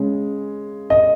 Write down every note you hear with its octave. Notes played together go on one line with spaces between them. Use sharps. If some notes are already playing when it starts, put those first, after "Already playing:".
Already playing: C#3 G#3 C#4
D#5